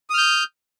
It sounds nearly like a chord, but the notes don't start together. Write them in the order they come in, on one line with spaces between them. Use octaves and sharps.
D#6 F6 G6